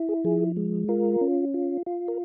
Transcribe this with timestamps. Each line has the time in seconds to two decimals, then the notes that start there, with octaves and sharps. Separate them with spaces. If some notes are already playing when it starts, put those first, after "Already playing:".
Already playing: E4
0.09 G#4
0.24 F3 G#4
0.57 G#3
0.89 F4 A#4
1.21 C#4
1.54 F4
1.86 F4
2.08 A#4